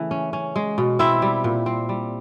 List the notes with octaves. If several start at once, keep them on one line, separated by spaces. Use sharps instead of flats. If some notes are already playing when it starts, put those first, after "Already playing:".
Already playing: C#3 E3 A3
C#4
C#4
G#3
B2
C4 E4 E5
G3
A#2
C4
G3